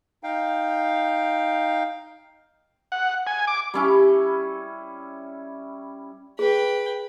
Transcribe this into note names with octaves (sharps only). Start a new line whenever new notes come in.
D#4 F5 G5
F#5
G#5
D6
G3 C#4 E4
G#4 B4 G5